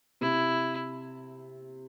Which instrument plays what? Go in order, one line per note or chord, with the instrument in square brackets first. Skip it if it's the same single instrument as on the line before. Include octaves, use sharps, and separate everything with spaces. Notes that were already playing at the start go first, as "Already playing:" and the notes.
[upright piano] C3 [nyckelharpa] E4